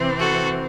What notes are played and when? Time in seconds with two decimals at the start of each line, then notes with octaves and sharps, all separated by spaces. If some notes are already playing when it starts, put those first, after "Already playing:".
Already playing: C3 E3 C4
0.19 F#4 A4